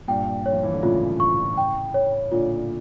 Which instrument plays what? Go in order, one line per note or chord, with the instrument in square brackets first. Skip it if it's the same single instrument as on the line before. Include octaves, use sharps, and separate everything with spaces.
[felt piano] G2 A#2 [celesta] G5
[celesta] C#5
[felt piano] F3
E3
D3
[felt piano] A2 C#3 [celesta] F4
[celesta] C#6
G5
C#5
[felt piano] A#2 D3 [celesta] F4